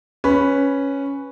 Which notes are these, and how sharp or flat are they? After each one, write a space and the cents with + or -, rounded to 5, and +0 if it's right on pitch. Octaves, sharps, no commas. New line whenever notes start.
C#4 +0 B4 +0